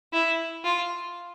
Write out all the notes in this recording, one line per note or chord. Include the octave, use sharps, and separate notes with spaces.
E4
F4